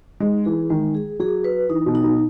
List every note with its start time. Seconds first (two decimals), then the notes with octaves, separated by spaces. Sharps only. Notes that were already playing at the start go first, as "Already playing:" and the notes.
0.20 G#3 D#4
0.45 E3 G#4
0.70 D#3 G#3
0.95 G#4
1.19 F#3 G#4
1.44 B4
1.69 E3 D#4
1.86 B2
1.95 D#4
2.03 B2